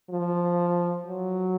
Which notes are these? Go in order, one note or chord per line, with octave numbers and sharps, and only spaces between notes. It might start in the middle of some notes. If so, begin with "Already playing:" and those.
F3
F#3